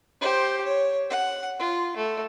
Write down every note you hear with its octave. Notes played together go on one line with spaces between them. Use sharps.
G4 C5
C#5
F#5
F4
A3